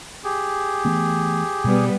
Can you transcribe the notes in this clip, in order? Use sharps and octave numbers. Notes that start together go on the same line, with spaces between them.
G4 G#4
E3 A3 B3
B2 G3 B3